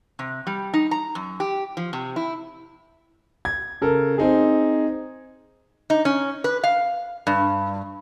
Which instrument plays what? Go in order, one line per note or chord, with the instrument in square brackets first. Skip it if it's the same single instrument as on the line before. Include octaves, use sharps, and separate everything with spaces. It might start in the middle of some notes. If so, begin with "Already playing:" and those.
[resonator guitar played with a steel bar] C3
G3
D#4
A#5
F#2
G4
F3
C3
E4
[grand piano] G#6
C#3 A4 A#4
C4 D#4 G#4
[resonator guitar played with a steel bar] D#4
C#4
B4
F5
G2